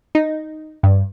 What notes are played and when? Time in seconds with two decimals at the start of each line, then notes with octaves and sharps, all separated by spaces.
0.15 D#4
0.83 G2